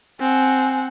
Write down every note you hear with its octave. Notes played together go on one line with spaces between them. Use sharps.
C4 F#5 G#5